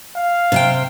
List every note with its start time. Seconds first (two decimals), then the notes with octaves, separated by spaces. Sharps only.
0.16 F5
0.52 C3 C5 G5